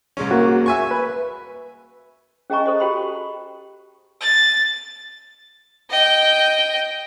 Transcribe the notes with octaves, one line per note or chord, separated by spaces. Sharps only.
C2 G#3 C#4
A#3 F#4
E5 G#5 C#6
B4
C#4 G#4 D#5 G#5 A#5 C#6
A4 C5 D#5
F#4 G4 G5 A5 B5 C6
A6
D#5 G5